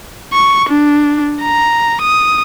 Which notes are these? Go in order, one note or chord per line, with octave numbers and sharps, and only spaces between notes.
C#6
D4
A#5
D#6